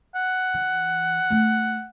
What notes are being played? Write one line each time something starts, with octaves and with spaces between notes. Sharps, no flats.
F#5
E3
A3 E4